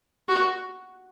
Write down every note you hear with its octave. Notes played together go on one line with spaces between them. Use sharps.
F#4